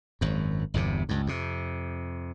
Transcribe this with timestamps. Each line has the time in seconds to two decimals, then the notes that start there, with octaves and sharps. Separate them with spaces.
0.21 G#1 F#2
0.74 G1 E2 G2 C3
1.09 C#2 G2
1.27 F2 C3